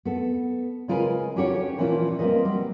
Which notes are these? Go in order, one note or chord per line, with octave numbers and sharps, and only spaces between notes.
B3 A4
C#3 G#3 F4 A#4 B4 G#5
C#4 D4 F#4 G4 A4 C#5
A#2 E3 F3 C#4 E4 F4
G3 A#3 C4 G#4 B4 D#5
F#3 G3